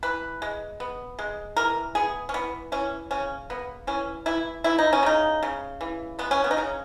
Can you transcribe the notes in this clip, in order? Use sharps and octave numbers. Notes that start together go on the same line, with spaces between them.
E3 B4
G#3
B3
G#3
E3 A#4
B3 G#4
C#4
E3 B3
E3 C#4
C#3 C#4
A#3 B3
E3 C#4
E3 E4
E3 E4
D#4
C#4
C#3 D#4
C#3
E3
G#3 B3
C#4
B3
D#4
C#3 C#4